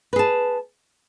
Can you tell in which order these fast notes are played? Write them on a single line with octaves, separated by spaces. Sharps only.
B4 G#4 A5